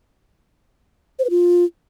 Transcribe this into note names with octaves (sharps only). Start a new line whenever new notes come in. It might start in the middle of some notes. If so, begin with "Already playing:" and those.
C5
B4
F4